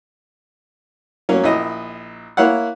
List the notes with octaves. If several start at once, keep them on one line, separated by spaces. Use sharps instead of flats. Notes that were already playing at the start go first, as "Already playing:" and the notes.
F#3 A#3 C#4
A#1 E4 D#5
A#3 E4 C#5 F5 F#5